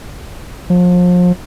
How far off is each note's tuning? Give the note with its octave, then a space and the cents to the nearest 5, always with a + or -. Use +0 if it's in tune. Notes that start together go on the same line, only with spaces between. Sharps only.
F3 +35